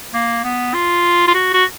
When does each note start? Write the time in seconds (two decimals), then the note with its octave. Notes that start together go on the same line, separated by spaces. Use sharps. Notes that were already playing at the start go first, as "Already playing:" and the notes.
0.14 A#3
0.44 B3
0.74 F4
1.27 F4
1.34 F#4
1.53 F#4